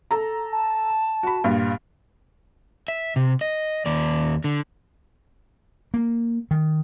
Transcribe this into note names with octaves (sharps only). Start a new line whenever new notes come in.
A4 A#5
A5
F#4 B5
G2 A#2
E5
C3
D#5
D#2 D5
D3
A#3
D#3